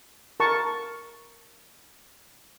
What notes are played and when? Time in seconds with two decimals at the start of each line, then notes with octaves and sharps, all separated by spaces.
0.40 A#4 A5 C#6